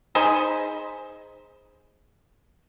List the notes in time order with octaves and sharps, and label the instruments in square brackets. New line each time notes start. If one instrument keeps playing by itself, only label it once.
[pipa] D#4 G#4 C5 B5